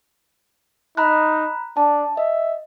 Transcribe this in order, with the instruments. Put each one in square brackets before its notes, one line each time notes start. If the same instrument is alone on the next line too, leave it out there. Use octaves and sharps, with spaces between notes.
[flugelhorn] D#4 [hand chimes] A#5 B5 F#6
[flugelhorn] D4 [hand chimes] A5
[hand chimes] D#5 [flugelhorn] E5